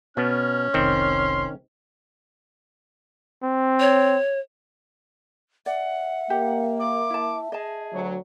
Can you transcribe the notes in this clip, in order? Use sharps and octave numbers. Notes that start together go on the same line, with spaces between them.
B2 B3 C#4 F6
F1 C2 D#3 C4 C6
C4
C#5
D5 E5 F#5
A#3 G4
D6
E4 A5
G#4 D#5 A5
D2 F#3